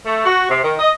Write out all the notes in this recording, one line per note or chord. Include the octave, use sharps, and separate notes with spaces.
A3
F#4
C3
D#3
D#5